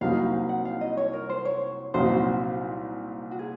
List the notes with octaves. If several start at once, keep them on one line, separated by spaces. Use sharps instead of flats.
C2 C3 F#3 A#3 D#4 F5
F#5
F5
D#5
C#5
A#4
C5
C#5
C2 A#2 F#3 C4 D#4 C5
F#4
G#4